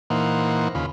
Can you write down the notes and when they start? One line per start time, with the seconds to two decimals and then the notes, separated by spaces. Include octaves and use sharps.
0.10 A#2 E3 A#3 D#4 C5 F#5
0.75 D#2 C#3 F4 B5